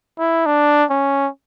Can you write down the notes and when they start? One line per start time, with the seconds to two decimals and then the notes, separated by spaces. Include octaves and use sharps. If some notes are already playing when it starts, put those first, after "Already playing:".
0.19 E4
0.46 D4
0.90 C#4